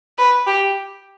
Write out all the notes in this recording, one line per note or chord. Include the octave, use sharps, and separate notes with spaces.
B4
G4